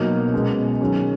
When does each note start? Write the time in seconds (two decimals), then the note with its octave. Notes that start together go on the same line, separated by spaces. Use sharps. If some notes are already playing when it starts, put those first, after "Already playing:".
Already playing: B2 F#3 A#3 D#4
0.33 B2 G#3 C#4
0.80 D#3 F#3 C#4 G#4